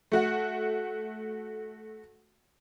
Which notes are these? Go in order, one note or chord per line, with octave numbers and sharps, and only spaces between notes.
A3 F#4 F#5